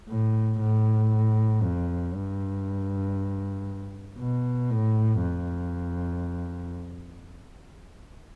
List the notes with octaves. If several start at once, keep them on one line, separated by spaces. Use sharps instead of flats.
A2
A2
F2
G2
B2
A2
F2